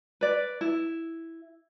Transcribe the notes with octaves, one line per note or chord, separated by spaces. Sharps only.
B4 D5
E4